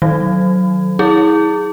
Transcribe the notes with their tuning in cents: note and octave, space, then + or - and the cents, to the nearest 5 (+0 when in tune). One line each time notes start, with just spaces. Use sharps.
D#3 +15 F#3 +0
E4 -35 G#4 +0